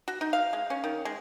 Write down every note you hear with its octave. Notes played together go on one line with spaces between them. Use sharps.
F#4
D#4
F5
G#3
C#4
D#3
G#3